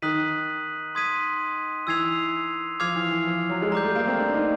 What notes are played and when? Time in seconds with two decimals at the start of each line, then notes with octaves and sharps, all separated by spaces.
0.02 D#3 D#6 F#6 B6 D#7 F#7
0.95 C6 D#6 G#6 B6 D#7
1.87 E3 E6 G#6 C7 F7
2.80 F3 D6 F6 G#6 C7 F7
2.96 E3
3.11 E3
3.27 F3
3.50 F#3
3.62 G#3
3.72 G3 A#5 D6 G6
3.84 A3
3.95 A#3
4.07 C4
4.19 D4
4.34 D#4